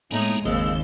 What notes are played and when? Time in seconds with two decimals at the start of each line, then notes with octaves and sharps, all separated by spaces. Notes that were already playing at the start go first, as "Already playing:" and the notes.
0.11 A2 G#3 A#3 B3 D#4 G#5
0.45 G1 D#2 C#3 G#3 C4 C5 F5 E6